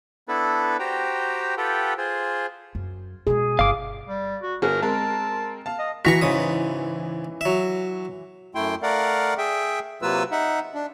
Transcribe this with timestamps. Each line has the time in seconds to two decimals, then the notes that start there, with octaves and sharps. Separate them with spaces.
0.28 B3 D4 E4 A4 B4
0.79 F#4 G4 C5 G5 A#5
1.57 F4 G4 A4 B4 F#5 G5
1.98 F4 G#4 C5
2.75 F#2
3.27 B2 G#3 G#4
3.59 G1 F5 D6
4.09 G3
4.42 F#4
4.62 G1 F#4 G#4 A#4
4.82 G#3 C4 A#4 A5
5.66 F5 A5
5.79 D#5
6.05 E3 F#4 A#5 C#6 B6
6.21 G#2 C#3 D#6
7.41 F#3 E5
8.55 F#2 A3 E4 G5 C6
8.83 A3 A#4 D5 F5 F#5
9.38 G#4 E5 G5
10.02 C3 F#3 A#3 F4 B4 E6
10.32 D#4 E5 F#5
10.74 D4